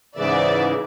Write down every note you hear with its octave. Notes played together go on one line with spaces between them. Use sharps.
G#2 C#3 E3 D5 E5